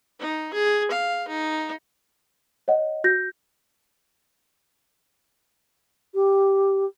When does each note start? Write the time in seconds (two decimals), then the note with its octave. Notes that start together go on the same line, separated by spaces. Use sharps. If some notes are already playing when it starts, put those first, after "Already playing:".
0.19 D#4
0.53 G#4
0.91 F5
1.28 D#4
2.68 C#5 D#5 F#5
3.04 F#4 G6 A#6
6.15 G4